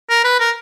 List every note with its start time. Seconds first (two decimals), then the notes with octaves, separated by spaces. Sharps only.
0.09 A#4
0.24 B4
0.40 A#4